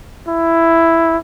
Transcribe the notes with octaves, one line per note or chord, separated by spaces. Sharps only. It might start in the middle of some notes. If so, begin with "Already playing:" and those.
E4